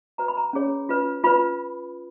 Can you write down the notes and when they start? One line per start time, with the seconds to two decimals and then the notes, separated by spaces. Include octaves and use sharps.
0.18 F#4 B4 A#5
0.28 B5
0.37 A#5
0.53 C#4 G#4 C#5
0.89 F4 B4
1.24 F4 B4 B5